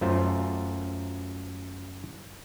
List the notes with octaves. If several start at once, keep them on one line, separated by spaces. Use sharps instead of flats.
F#2 A3 F4 C5